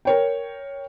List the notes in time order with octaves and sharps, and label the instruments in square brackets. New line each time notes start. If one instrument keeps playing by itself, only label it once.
[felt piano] A#4 C#5 G5